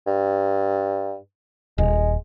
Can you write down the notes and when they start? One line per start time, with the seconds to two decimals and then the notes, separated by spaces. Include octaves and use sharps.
0.07 G2
1.78 D#1 G#3